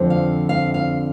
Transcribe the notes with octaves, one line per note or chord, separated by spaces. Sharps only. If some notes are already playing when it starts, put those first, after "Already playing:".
Already playing: F2 D3 F3 C4
F5
F5
F5